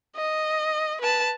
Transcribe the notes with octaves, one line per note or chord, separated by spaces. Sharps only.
D#5
B4 A5